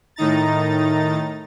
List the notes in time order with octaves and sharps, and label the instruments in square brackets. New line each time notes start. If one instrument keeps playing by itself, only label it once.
[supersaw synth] A2 D#3 D#4 A#5 A6